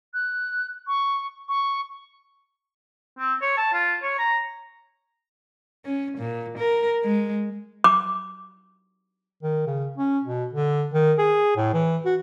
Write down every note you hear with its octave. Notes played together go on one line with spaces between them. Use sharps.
F#6
C#6
C#6
C4
C#5
A5
F4
C#5
A#5
C#4
A#2
A#4
G#3
D6
D#3
C#3
C#4
B2
D3
D#3
G#4
A2
E3
F#4